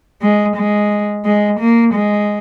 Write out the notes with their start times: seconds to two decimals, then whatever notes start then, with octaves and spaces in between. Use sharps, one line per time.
0.22 G#3
0.56 G#3
1.25 G#3
1.60 A#3
1.94 G#3